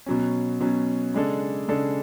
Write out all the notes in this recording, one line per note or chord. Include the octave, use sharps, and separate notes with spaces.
B2 F#3 C#4
B2 F#3 C#4
C#3 G#3 D4 A4
C#3 G#3 D4 A4